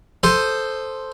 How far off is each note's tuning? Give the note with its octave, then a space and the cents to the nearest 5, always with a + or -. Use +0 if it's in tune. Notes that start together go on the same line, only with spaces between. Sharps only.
A4 +0 C5 +0 D#6 -15